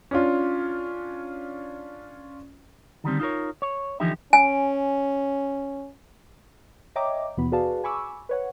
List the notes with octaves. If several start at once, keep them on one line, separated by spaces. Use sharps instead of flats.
C#4 D4 F4
D3 D#3 G3 C4
D#4 F4 A4 A#4 C#5
C#5
D3 E3 F3 D#4 G4 E5
C#4 G#5
C#5 D#5 E5 G5 A#5 D6
D#2 B2 E3 B3 B5
F#4 G#4 B4 D5 F5 A5
G#5 B5 C#6 D6 E6
B4 C#5 F#5